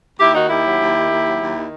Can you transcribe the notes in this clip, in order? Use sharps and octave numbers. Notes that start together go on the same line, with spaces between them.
D#2 E4 G4
D#3 D#4 F#4
D#2 E4 G4
F#3
D#2
D#3
D#2
F#3
D#2
D#3